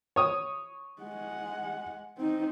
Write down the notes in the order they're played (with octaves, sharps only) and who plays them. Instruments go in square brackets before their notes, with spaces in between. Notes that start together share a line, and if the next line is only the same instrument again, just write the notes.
[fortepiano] C#5 D#6
[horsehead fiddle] G#3 F#5
C4 D#4